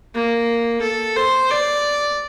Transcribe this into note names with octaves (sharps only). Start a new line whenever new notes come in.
A#3
A4
C5
D5